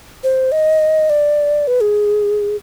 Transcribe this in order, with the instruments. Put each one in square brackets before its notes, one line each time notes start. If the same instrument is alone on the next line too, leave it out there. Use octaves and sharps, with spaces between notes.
[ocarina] C5
D#5
D5
B4
G#4